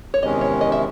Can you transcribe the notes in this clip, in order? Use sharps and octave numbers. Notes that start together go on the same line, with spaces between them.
C#5
E2 C3 D#3 G#3 C#4 D#5
C#5
D#5
E5